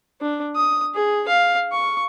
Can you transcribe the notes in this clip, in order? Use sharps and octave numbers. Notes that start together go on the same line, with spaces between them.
D4
D#6
G#4
F5
C#6